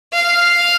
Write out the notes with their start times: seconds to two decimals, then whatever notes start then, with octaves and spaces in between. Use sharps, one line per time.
0.13 F5